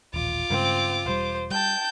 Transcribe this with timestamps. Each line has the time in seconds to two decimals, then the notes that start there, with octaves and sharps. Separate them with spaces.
0.14 D#1 A1 F4 D6
0.50 G2 C#3 G#3 C4
1.06 E1 G3 C5
1.51 G3 G5 A5 G6